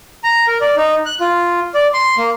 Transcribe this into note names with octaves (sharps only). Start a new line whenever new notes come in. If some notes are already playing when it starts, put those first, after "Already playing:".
A#5
A#4
D5
D#4
F#6
F4
D5
C6
A#3